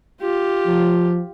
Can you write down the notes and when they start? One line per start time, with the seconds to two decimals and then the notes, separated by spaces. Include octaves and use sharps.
0.21 F4 G4
0.67 F3